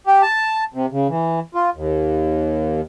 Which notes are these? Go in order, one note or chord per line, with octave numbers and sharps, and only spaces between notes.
G4
A5
C3
C#3
E3
F4
D#2